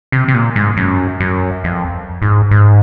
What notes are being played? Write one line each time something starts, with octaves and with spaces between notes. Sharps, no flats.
C3
C3
A#2
G#2
F#2
F#2
F2
G#2
G#2